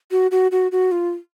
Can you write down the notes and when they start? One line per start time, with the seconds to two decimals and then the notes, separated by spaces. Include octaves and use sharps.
0.11 F#4
0.31 F#4
0.52 F#4
0.72 F#4
0.92 F4